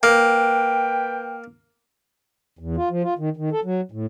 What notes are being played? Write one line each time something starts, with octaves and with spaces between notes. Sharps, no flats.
A#3 B4 G5
E2
F4
F3
F4
D#3
D#3
A4
F#3
A2